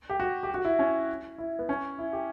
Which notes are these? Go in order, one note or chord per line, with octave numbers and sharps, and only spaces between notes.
G4
F#4
G4
F#4
E4
C#4
E4
B3
C#4
E4
G4